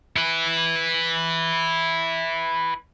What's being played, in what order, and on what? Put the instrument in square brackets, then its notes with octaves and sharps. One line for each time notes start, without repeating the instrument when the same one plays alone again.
[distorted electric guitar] E4 B4